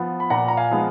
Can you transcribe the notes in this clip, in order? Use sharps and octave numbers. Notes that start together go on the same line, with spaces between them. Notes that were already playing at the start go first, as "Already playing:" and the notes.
Already playing: F3 B3
B5
A#2 F#5 A#5
A#5
F5 G#5
F3 G#3 B3